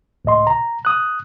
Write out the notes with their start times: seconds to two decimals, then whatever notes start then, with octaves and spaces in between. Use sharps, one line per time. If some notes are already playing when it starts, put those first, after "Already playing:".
0.25 C#2 A2 D#5 C6
0.47 A#5
0.85 D#6 F#6